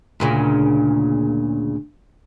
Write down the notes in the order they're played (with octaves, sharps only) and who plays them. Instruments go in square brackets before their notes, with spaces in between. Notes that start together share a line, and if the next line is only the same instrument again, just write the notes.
[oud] D2 A#2 C#3